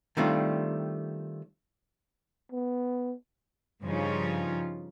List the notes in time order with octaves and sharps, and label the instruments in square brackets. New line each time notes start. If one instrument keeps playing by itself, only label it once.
[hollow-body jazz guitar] D#3 G3 A3 C4 D4 F4
[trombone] B3
[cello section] G2 C#3 F3 C#4 D#4 F4